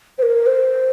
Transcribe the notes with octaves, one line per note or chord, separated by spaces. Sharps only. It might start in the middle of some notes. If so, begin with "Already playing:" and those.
C5
A#4
C5